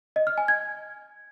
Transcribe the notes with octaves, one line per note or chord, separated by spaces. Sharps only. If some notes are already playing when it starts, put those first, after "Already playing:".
D#5
F6
G#5
G#6